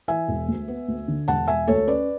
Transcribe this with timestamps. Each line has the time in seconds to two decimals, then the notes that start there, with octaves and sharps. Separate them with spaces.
0.08 E3 E5 G#5
0.28 E1
0.48 D2
0.68 B3
0.88 D2
1.08 D3
1.28 E1 F#5 A5
1.48 E1 E5 G#5
1.67 D2 A4 C#5
1.87 C#4 B4 D5